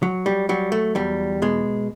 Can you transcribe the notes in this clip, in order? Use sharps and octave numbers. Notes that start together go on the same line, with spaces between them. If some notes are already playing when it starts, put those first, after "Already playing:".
F#3
G3
F#3 G3
A3
E2 G3
B2 G#3